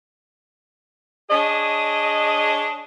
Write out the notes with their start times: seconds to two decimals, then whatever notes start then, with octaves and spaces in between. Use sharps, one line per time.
1.30 D4 G#4 C#5 D#5